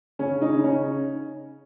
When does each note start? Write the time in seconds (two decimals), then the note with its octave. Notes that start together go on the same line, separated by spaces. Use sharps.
0.19 C#3 C#4
0.42 D#4
0.54 C#3
0.64 C#4